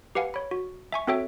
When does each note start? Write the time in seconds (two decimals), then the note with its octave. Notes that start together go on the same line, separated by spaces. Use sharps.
0.15 G4 B4 F5 F#5 G#5
0.34 C#5 B5
0.51 F#4
0.92 E5 G#5 C#6
1.07 C4 F#4 A4 C#5 E5 G5